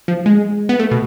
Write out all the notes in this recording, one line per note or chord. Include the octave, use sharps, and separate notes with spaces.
F3
G#3
B3
A3
B2